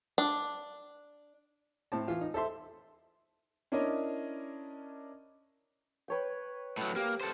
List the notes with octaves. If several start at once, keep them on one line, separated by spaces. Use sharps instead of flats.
D4
A2 C4 A5
E3 F4
D#4
A4 C5 E5 C6
C#4 D4 E4 A#4 C#5 D#5
B4 C#5 G5
A2 F#3
A#3 G4
A4 C5